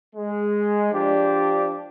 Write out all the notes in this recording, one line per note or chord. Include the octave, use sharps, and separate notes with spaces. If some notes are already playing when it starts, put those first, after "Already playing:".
G#3
F3 D4 G4